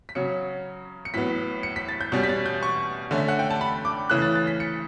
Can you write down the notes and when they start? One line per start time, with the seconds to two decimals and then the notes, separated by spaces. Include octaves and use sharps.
0.09 B6
0.15 C#3 F#3 C#4 C#7
1.05 C#7
1.14 A2 F#3 B3 B6
1.63 C#7
1.76 B6
1.89 A6
2.01 G6
2.12 B2 G3 C#4 G6
2.23 B6
2.29 A6
2.46 G6
2.63 C#6
3.11 D3 A3 C#4
3.18 E5
3.28 F#5
3.39 G5
3.50 A5
3.61 B5
3.85 D6
4.10 C#3 E3 A3 F#6
4.22 A6
4.35 A6
4.47 B6
4.60 C#7